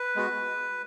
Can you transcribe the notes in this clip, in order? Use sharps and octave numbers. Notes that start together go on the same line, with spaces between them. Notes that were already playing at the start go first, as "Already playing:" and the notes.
Already playing: B4
G#3 B3 F#4